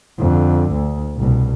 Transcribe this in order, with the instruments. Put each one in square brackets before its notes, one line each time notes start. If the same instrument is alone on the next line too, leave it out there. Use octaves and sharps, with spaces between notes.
[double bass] F2 D3
D2
C2 B2